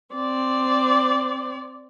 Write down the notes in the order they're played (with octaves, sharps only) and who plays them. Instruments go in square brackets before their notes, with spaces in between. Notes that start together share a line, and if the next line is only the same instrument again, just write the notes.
[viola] C4 D5